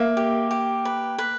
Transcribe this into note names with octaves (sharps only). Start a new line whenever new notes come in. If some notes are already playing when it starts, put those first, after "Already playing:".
Already playing: A#3 E5
G4
G4
B4
B4